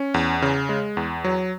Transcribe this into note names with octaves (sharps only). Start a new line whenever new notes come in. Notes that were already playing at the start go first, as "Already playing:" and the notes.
Already playing: C#4
E2
C#3
G#3
E2
F#3